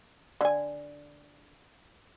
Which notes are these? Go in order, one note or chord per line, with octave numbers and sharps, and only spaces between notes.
D3 G#5